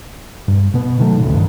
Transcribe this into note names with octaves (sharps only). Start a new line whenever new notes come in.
G2
B2 B3
B2 D#3 F#3 A3
A1 D2
B1 G2 D#3